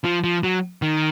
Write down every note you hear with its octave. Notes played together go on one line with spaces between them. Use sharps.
F3
F3
F#3
D#3